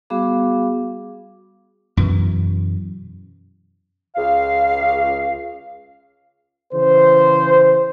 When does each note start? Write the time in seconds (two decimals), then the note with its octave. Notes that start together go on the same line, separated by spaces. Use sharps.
0.10 G3 B3 F#4 G#4 F5 D6
1.97 F#2 B2 E3
4.16 C#2 F5
6.73 C#3 E3 C5